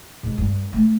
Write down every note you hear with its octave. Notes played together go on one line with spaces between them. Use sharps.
G#2
G2
A3